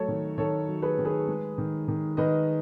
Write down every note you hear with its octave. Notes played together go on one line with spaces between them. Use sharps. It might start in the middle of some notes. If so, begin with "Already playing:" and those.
Already playing: F#3 A3 A4 C#5
D#3
D#3 A4 C#5
F#3
G#4 B4
D#3
G#4 B4
G#3
D#3
D#3
D#3 B4 D#5